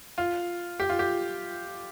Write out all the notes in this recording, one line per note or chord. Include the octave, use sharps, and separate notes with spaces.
F4
G4
F4
G4